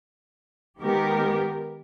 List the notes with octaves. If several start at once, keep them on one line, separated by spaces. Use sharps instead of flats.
D#3 G#3 B3 G4 A#4